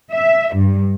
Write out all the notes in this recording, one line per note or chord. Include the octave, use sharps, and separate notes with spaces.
E5
G2